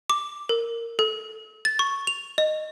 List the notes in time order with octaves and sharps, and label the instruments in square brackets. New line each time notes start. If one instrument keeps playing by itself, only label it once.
[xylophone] D6
A#4
A4
A6
C#6
F7
D#5